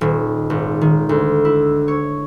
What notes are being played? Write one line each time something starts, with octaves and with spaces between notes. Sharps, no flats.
D#1
G#1
D#3
D2
E4
C#5